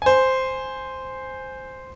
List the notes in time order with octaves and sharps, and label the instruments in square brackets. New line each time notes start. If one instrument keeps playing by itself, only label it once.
[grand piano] C5 G#5